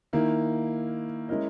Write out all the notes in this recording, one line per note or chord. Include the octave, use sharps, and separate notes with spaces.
D#3 A#3 E4
G#3 C#4 E4 A#4 D#5